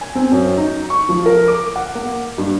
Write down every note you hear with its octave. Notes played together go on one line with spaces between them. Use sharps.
G#5
C4
F#2
D#4
C#6
F3
A#4
D6
F#5
A#3
G2